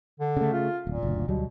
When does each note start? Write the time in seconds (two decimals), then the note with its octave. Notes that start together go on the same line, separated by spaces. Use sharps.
0.20 D3
0.37 C#3 A3
0.53 F4
0.87 D1 A#2
1.03 F#1 D2
1.28 D2 B2 F#3 G3